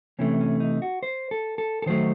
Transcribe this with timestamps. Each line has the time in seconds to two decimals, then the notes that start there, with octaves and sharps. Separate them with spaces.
0.19 C3 E3 A3 C#4
0.40 C#4
0.60 D#4
0.82 F#4
1.03 C5
1.31 A4
1.58 A4
1.82 A4
1.86 D#3 F#3 A3 C5